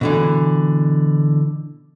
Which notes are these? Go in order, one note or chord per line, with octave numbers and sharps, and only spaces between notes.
B2 D3 E3